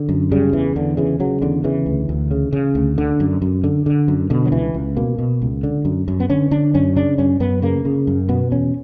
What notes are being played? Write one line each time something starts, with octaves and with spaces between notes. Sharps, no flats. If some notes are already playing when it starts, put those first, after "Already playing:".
Already playing: D3
F#2
C#3 G3
E2 E3
E2 D3
C#3 E3
C#3 F#3
E2 D3
C#3 E3
D2
D2
C#3
C#3
D2
D3
F#2
F#2
D3
D3
F#2
B2 D3
F#3
C#2 E3
C#2
B2 A#3
B2
C#2
D3
F#2
F#2
B3
D3 C#4
D3 D4
F#2 C#4
C#3 D4
F#2 C#4
F#2 B3
C#3 A#3
C#3
F#2
B2 B3
E2 C#4